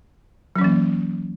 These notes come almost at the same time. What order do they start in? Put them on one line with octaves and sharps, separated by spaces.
F#3 C#4 E3 A#3